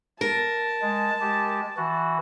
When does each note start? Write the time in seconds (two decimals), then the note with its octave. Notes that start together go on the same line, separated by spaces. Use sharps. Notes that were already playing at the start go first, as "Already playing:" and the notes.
0.21 A#4 A5
0.82 G#3
1.21 G#3 G4
1.77 E3 F#4